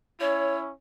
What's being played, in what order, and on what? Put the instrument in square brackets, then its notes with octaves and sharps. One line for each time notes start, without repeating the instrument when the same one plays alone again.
[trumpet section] C#4 E4 [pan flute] C#5